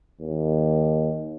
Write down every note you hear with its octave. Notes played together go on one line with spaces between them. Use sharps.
D#2